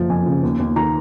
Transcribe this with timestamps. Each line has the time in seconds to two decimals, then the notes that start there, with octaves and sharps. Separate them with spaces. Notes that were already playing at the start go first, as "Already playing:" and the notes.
Already playing: F#1 F3
0.09 F2 G#5
0.26 C#3
0.43 D#2
0.60 D#2
0.76 D#3 A#5